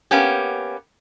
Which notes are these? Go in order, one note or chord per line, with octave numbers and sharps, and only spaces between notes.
A#3 B3 C#4 G4